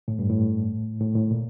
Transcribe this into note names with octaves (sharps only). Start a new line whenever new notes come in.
A2
G2
A2
A2
A2
A#2